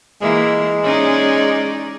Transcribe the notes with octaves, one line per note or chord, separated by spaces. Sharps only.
E3 G#3 A#3 E4
C#4 D#4 D5